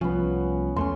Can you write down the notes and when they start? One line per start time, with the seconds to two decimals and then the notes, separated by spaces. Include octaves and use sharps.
0.01 C2 F3 B3 C#4
0.76 E2 A3 C#4 C6